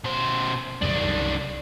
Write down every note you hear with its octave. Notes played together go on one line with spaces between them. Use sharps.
B2 C5
C2 F#2 D#3 D4